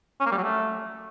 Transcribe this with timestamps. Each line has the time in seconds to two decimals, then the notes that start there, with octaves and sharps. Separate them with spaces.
0.20 C#4
0.26 A#3
0.32 G3
0.38 F#3
0.43 A3